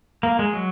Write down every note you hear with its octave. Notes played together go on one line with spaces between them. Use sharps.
A#3
G#3
F#3